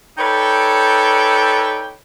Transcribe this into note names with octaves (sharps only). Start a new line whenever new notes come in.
D#4 A4 B4 C#5 D5 G5